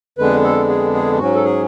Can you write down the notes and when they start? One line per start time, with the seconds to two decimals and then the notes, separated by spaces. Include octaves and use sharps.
0.18 F2 D3 G#3 B3 D4 B4
0.44 A4
0.69 G#4
0.94 G#4
1.19 G#2 F#3 C#4 F#4
1.35 A4
1.44 G#4